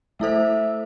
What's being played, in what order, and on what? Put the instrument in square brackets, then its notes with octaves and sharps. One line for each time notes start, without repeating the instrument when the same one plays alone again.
[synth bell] A3 E4 A4 C5 [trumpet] E5